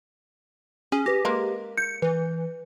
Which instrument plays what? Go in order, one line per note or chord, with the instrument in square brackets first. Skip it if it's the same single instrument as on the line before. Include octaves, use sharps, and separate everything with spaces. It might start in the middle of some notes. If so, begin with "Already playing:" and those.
[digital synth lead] C#4 [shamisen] G#4
[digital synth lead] G4 [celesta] B4 A#6
[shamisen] G#3 A#3
[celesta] G6 [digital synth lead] C#7
[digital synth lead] E3 [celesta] B4